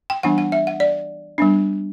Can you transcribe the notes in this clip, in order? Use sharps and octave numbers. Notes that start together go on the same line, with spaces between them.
G5
E3 G3 B3 D4 F#5
F#5
E5
F#5
D5
G3 B3 D4